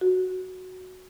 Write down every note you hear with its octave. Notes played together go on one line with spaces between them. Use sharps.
F#4